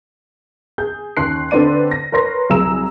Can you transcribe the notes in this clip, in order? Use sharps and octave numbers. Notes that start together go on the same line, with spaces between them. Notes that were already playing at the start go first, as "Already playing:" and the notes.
G#4 G6
D#2 C#4 C6 F#6 C7
D3 C4 B4 D5 D#7
A#6
A#4 B4 C#5 C6 A#6
C2 F#3 G#4 A#5 E6 E7